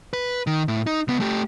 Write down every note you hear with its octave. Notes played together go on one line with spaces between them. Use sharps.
B4
D#3
A2
D#4
C#2 B3
A3 G4